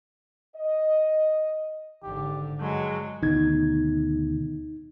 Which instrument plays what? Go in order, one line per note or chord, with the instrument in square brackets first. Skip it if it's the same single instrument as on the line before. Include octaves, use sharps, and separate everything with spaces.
[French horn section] D#5
[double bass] G#1 D3 [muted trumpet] G4
[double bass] G2 [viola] F#3 [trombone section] G#3 [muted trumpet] A4
[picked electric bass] D2 B2 D#3 [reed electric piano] D#4 G#6